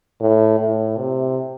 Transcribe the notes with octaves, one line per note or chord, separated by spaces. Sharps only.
A2
A2
C3